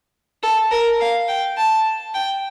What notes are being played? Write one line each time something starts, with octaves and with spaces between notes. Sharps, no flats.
A4
A#4
F5
G5
A5
G5